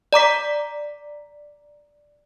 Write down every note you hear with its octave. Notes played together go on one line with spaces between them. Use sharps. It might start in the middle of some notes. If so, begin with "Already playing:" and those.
D5 A#5 D6 B6